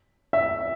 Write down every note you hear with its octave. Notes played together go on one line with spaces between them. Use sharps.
E5